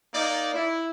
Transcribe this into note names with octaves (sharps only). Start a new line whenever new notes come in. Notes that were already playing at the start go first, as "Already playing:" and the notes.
A#3 D#4 D5
E4